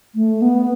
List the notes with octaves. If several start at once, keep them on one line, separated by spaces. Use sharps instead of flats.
A3
B3